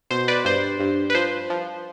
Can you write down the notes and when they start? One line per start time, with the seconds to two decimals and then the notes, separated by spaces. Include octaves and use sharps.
0.11 B2 C5
0.28 B4 D5
0.45 G2 C5
0.80 G2
1.10 B4
1.15 F3 C5
1.50 F3